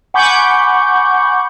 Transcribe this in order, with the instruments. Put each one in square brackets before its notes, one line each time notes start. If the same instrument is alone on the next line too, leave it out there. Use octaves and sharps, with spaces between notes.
[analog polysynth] F#5 G#5 B5 C#6 D6 G6